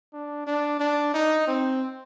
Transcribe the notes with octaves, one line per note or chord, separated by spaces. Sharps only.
D4
D4
D4
D#4
C4